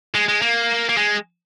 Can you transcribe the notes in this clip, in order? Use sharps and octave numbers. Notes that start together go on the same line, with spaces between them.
G#3
G#3
A#3
A#3
G#3